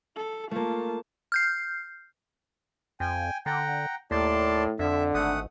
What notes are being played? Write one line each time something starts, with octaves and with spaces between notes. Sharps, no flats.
A4
A3 A#3 F4 A5
F6 G6 C7
F2 G5 G#5
D3 F#5 G5 A#5
D#2 A2 D5 A5 C6
F2 D3 E5
G#1 A3 F#5 D#6